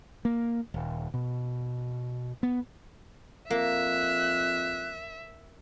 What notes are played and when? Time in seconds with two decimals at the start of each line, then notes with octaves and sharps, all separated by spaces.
0.25 A#3
0.74 D#1
1.14 B2
2.43 B3
3.50 F2 A#3 E5 F#6